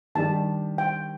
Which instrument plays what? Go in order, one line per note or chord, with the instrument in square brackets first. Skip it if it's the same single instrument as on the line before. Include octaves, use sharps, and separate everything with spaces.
[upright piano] D#3 G3 D4 G4 [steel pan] A5
[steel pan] G5